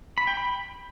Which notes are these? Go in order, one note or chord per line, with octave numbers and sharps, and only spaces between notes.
B5
G5
B5